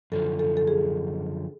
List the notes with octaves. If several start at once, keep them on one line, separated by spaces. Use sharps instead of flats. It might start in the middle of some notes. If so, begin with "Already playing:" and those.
F#2 D3 F3 A4
A4
A4
G#4